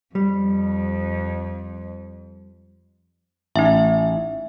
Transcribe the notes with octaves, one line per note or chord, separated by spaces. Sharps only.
F2 G3
A1 D#4 E5